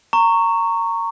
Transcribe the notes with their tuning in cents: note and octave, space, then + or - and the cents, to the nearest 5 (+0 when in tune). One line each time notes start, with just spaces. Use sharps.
A#5 -20 C#6 +0